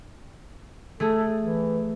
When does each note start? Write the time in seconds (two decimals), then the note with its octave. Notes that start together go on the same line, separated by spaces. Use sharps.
1.00 A3 G#4 A4
1.41 E3